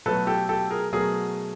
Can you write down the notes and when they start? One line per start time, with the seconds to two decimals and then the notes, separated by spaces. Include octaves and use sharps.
0.06 B2 F#3 A3 A4 B4
0.27 G4 A4
0.49 G4 A4
0.70 G#4 A#4
0.92 B2 F#3 A3 G#4 A#4